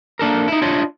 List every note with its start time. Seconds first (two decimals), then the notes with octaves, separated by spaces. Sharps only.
0.19 A#3 D4 A4 A#4
0.48 D#4 E4
0.62 D4 E4 F4 C#5 D#5